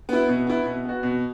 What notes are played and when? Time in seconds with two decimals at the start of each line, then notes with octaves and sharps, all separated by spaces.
0.09 B3 E4
0.28 B2
0.47 B3 E4
0.66 B2
0.85 B3 F#4
1.03 B2